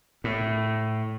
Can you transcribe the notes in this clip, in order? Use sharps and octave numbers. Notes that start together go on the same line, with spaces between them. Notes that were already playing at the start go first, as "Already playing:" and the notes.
A2